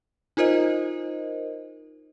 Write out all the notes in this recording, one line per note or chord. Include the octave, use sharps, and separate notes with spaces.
D#4 F4 A#4 C5 D#5